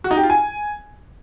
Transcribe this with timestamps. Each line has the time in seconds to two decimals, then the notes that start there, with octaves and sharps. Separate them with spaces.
0.04 F#4
0.11 D#4
0.17 G4
0.23 F4
0.30 G#5